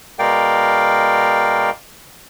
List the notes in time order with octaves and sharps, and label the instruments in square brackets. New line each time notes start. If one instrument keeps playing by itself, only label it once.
[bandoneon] B2 G#3 A#4 D5 F5 G5